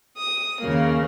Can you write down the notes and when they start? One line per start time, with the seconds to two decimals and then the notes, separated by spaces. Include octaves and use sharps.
0.17 D#6
0.61 D#2 C#3 A#3